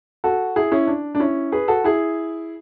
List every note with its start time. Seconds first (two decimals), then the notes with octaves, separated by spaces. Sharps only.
0.24 F#4 A4
0.56 E4 G#4
0.71 C#4 E4
0.87 D4
1.15 D4
1.20 C#4 E4
1.52 G#4 B4
1.68 F#4 A4
1.84 E4 G#4